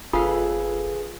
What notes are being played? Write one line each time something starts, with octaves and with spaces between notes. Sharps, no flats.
G1 F4 G#4 A4 B4 F5